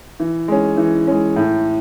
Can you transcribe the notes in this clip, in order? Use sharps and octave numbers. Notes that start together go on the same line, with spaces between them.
E3
G#3 C#4
E3
G#3 C#4
A2